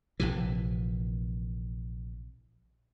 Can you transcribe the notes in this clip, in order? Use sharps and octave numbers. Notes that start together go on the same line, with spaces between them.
A#1 C3 E3